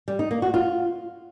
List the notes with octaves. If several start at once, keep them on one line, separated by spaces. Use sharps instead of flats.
G3
D#4
A#3
F#4
F4